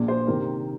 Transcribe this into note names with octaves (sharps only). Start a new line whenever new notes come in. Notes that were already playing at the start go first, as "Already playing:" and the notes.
Already playing: A#1 A#2
C5
C3 D#3 A#4